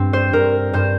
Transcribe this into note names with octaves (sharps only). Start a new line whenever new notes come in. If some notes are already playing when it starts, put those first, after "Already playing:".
Already playing: G2 C4
C5
G2 A#4
G2 C5